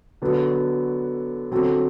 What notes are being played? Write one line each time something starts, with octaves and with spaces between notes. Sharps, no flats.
D3 F#3 B3 F#4 A4
D3 F#3 C4 F#4 A4